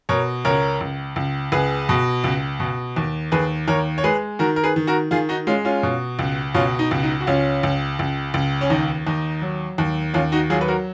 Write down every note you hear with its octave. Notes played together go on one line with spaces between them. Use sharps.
B2 A#4 C#5
C#2 A#4 C#5
C#2
C#2
C#2 G#4 B4
B2
C#2
B2
D#2
D#2 G#4 B4
D#2 A#4 C#5
C#5
G#3 G#4 B4
D#3 F#4 A#4
A#4
G#4 B4
D#3
F#4 A#4
D#3 F4 G#4
D#4 F#4
G#3 C#4 F4
C#4 F4
B2
C#2
B2 C#4 F4
D#4
C#2
D#4
F#4
C#2 C#4 F4
C#2
C#2
C#2
C#4
D#2 D#4
D#2 D#4
F#3
D#2
D#2 C#4 F4
D#4 F#4
F#3 F4 G#4
B4
F#4 A#4